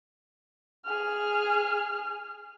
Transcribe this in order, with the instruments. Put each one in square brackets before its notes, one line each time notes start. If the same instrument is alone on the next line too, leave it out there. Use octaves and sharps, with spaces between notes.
[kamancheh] G#4 F6